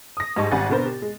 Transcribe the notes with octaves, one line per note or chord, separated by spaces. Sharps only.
D#6 A#6
G#2 G3 D#5 A5 C#6
G#1 G3 F#5 G#5 A6
B2 D3 B3 A#4 C5
G4
G#3